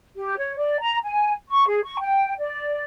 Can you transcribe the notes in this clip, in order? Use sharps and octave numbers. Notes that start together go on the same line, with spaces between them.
G4
C#5
D5
A#5
G#5
C#6
G#4
C#6
G5
D5